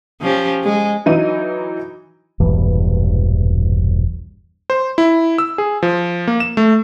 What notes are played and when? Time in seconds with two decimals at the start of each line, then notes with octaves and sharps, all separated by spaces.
0.21 F3 C#4 G4
0.64 G#3
1.06 E3 F#3 D#4 D#7
2.40 E1 A#1 G2 E3
4.70 C5
4.98 E4
5.38 E6
5.58 G#4
5.83 F3
6.27 A#3
6.40 E7
6.57 A3